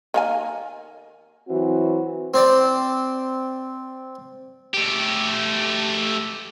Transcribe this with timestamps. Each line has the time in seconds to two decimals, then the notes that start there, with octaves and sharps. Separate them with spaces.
0.14 D#3 A#3 G#5
1.49 E3 F#3 C4 F#4
2.34 C4 D5
4.74 A3 G4